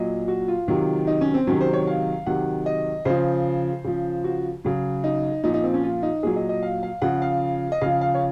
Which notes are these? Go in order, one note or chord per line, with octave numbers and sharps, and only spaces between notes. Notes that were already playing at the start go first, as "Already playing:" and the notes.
Already playing: A#2 F#3 D#5
F#4
F4
C3 D#3 F#3
D#4
C#4
C4
C3 D#3 F#3 C#4
C5
C#5
F5
C3 D#3 F#3 F#5
D#5
C#3 F3 C5
C#3 F3
F#4
C#3 F#3
D#4
A#2 F3 D#4
D#4
C4
C#4
F4
D#4
A#2 F#3 G#4
D#5
D#5
F5
F5
C#3 F3 F#5
F5
D#5
C#3 F3 F5
F5
C#5